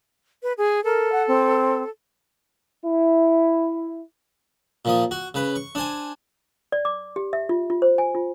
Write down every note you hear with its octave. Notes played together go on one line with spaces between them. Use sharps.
B4
G#4
A4 A#4
F#5
C4
E4
A#2 F3 D#6
F#4
C#3 B4
C#6
D4 C5 G#5
D5
D6
G4
E5
F4
F4
C5
G#5
F4